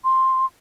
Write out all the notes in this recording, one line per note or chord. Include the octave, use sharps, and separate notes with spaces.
C6